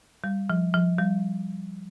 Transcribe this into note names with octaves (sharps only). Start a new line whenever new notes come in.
G3
F3
F3
G3